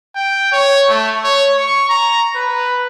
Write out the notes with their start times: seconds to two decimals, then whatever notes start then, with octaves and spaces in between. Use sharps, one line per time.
0.15 G5
0.52 C#5
0.89 A3
1.24 C#5
1.57 C#6
1.89 A#5
2.36 B4